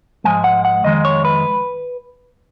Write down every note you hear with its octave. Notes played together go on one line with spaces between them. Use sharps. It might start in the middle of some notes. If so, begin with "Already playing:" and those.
G#2 F3 G#3 G#5
F#5
F#5
F2 D#3 G#3 D#5
C#5
B4